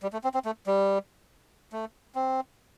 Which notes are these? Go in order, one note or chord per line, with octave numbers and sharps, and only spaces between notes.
G3
A3
C4
C4
A3
G3
A3
C4